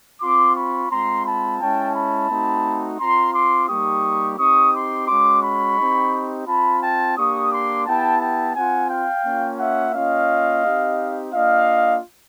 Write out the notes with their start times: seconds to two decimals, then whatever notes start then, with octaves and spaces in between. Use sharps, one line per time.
0.22 C4 F4 C6 D6
0.56 B5 C#6
0.91 G#3 C4 F4 A#5 C6
1.26 A5 B5
1.61 G#3 C#4 E4 G5 A5
1.95 A5 B5
2.30 A3 C4 D#4 F#4
3.00 C4 F4 A#5 C6
3.34 C6 D6
3.69 G3 A#3 D#4 G4 C#6 D#6
4.39 C4 D#4 G4 C#6 D#6
4.74 C6 D6
5.08 G#3 C#4 F#4 C6 D6
5.43 B5 C#6
5.77 C4 D#4 G4
6.47 C4 F4 A5 B5
6.82 G5 A5
7.17 A#3 D4 G4 C#6 D#6
7.51 C6 D6
7.87 B3 E4 G4 G5 A5
8.21 G5 A5
8.55 C4 F4 F#5 G#5
8.90 F5 G5
9.25 A#3 C#4 F4
9.60 E5 F#5
9.95 A#3 C#4 F4 D#5 F5
10.65 C4 D#4 G4
11.33 A#3 D4 F4 D#5 F5